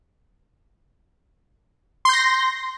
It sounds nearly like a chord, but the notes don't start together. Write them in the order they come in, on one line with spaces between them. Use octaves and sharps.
C6 G6 A#6